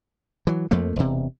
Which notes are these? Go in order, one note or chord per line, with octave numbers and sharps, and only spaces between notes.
E3 F#3
F2 F3 A3 A#3
E1 C3